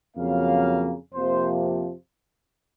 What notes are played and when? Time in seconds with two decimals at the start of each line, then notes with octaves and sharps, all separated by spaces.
0.16 F2 C#3 F#3 A#3 F5
1.13 F2 C3 F3 A#3 C5